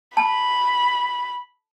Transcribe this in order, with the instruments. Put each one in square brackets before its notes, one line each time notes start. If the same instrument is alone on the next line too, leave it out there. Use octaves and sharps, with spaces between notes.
[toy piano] A5 [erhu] B5